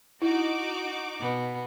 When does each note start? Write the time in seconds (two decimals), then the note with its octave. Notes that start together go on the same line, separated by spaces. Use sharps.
0.22 D#4 E4 F#4 D6
1.20 B2 B3